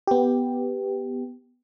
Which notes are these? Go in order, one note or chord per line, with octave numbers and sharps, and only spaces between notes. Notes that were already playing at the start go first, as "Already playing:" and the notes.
B3 G4